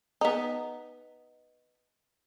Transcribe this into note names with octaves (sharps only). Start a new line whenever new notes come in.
B3 D#4